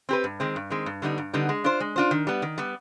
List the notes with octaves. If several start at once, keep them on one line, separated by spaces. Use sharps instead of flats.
C4 G4 B4
G2
D#3 G#3 C4
G2
D#3 G#3 C4
G2
D3 G3 B3 D#4
G2
D3 G3 B3 D#4
G#3
D4 F4 C5
G#3
D4 F4 C5
D#3
G3 B3
D#3
G3 B3